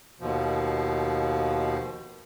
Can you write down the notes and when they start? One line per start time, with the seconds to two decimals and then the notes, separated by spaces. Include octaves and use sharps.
0.20 D#2 B2 F3